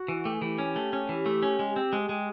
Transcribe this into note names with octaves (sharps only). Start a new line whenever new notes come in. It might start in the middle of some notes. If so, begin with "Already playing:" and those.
Already playing: F#4
E3
A3 G4
G#4
E3 G4
C#4
A3
C#4
E3
A3
C#4
G#3
C4
G#3
G#3